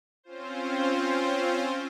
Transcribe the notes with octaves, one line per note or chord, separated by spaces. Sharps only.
C4 C#4 F4 C5